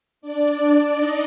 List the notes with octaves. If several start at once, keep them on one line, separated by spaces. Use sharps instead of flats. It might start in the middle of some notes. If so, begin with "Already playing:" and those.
D4 D5
D#4 D#5